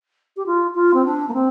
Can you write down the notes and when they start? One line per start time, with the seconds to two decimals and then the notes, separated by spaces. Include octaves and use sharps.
0.36 G4
0.46 F4
0.75 F4
0.94 C4
1.05 D4
1.28 A#3
1.33 C4